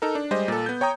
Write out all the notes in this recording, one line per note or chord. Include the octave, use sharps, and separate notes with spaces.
D#4 A4 A#4
D4
G3 G#3 C5 D#5
A#2 A4
B3 G6
C#5 G5 A#5 D#6